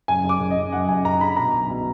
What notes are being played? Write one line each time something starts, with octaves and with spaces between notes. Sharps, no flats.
F#1 G#5
F#1
D6
F#1
D#5
F#1
F#2 F#5
F#1 G#5
F#1 A#5
D3 B5
B2 A#5
B1
B2